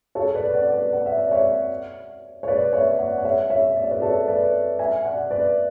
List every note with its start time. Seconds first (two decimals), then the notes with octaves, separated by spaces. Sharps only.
0.15 A4 C#5
0.35 B4 D5
0.54 D5 F#5
0.73 B4 D5
0.93 F#5
1.06 E5
1.18 D5
1.31 C#5 E5
2.43 C#5
2.47 B4 D5
2.73 C#5 E5
2.99 D5 F#5
3.18 F#5
3.24 C#5 E5
3.50 C#5 E5
3.76 D5
3.83 C#5
3.91 B4 D5
4.02 A4 C#5
4.28 B4 D5
4.79 E5 G#5
5.05 D5 F#5
5.31 B4 D5